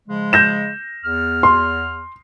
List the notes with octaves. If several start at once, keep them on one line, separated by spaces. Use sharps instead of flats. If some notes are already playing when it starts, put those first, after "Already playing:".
C#3 F3 G#3
G6 A#6 E7
E2 F6
C6